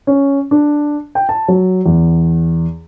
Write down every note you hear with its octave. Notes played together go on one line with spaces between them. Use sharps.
C#4
D4
G5
A5
F#3
E2